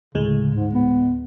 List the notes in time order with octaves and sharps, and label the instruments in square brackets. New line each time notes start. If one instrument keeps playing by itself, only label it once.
[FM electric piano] D2 A2 G#3 [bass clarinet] C#3
[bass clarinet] G#2
B3